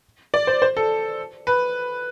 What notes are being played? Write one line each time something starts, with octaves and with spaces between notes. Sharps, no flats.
D5
C5
C5
A4
B4